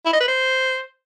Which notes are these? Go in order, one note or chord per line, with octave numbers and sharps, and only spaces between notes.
E4
D#5
B4
C5